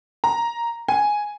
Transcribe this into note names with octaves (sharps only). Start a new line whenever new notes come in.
A#5
G#5